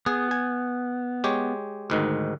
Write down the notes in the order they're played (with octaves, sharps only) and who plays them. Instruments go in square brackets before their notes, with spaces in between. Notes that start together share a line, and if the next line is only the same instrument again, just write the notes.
[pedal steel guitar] B3 [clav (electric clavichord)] G#4
[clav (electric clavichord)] G#5
G#3 G4 C#5
D2 G#2 D#3